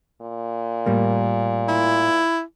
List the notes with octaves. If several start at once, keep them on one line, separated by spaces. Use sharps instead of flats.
A#2
A2 G3 A#3
E4